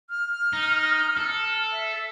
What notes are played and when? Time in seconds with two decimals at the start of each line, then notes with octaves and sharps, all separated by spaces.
0.09 F6
0.53 D#4
1.18 A4
1.72 E5